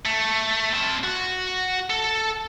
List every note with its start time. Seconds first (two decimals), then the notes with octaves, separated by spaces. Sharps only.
0.06 A3
0.73 C4 A5
1.03 F#4
1.90 A4